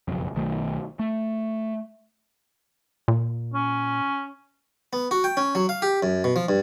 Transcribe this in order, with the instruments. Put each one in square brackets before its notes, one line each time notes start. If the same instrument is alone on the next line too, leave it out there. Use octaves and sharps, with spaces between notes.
[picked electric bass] F#1 B1 F2
B1 D#3 A3
A3
[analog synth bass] A#2
[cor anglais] C#4
[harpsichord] B3
F#4
G5
C#4
F#3
F5
G4
F#2
B2
F3
G2